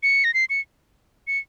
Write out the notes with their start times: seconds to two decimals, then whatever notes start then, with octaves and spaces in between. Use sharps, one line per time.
0.03 C#7
0.24 A#6
0.34 C7
0.50 C#7
1.27 C#7